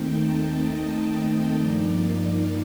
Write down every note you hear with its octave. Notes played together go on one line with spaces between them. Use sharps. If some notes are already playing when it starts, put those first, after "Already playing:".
Already playing: D#2 D#3 A3 C4 D#4 G5
A5
D#5
G2 F3 A#3 D#4 D5